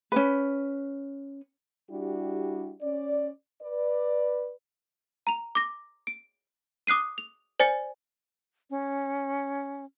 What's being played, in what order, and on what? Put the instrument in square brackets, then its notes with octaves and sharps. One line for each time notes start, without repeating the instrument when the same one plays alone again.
[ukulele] C#4 D4 B4
[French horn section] G3 D4 E4 F#4 G4
C#4 D5
B4 D5
[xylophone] A#5 F7
D6 A#6
D7
D6 D#6 F#6 C7 D#7
F7
C5 D5 G#5 A6 C#7
[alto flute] C#4